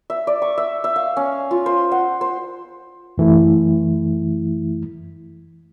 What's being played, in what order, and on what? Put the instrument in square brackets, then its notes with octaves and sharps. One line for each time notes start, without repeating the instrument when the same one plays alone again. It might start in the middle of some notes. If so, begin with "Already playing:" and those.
[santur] E5
D5
C#6
E5
E5
F5
C#4
F4
C5
F#5
C5
[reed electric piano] F#2 E3 A3 E4